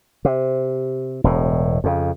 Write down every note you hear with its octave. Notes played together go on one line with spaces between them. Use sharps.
C3
E1 A2
F2 C#3